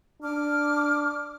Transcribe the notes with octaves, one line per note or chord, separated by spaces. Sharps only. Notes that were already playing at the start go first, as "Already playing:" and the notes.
D4 D6 F6